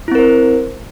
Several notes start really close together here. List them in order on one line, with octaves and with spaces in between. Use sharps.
E4 C4 A#4 C5